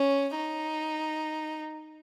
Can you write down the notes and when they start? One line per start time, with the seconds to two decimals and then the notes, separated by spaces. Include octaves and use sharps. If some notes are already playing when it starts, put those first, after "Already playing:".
Already playing: C#4
0.36 D#4